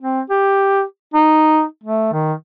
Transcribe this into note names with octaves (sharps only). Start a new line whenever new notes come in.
C4
G4
D#4
A3
D#3